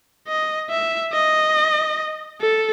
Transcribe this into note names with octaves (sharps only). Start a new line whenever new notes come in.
D#5
E5
D#5
A4